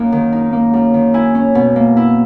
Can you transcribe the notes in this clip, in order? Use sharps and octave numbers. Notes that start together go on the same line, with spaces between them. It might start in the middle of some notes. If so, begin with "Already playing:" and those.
Already playing: F#2 A#3 D#4
D#3
D#4
A#3
F#2
D#3
E4 G#5
C#4
B2
A#3
E4